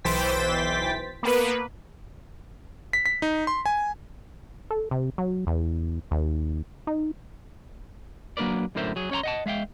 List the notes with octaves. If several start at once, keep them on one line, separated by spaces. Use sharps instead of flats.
B1 E3 C5 G5 A6 B6
A#3 B3 B4
B6
B6
D#4
C6
G#5
A4
C3
F#3
E2
D#2
D#4
F#3 A#3 D4 A#4 B4 D5
F#2 A2 D3 A#4 C5 E5
F#3 G#4
C#4 C#5 F#5 A#5 C6
D#5 F#5 A5
G#3 E5 F5 G5